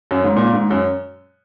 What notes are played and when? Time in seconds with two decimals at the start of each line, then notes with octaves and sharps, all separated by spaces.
0.11 F#2
0.24 G#2
0.36 A#2
0.53 G#2
0.71 F#2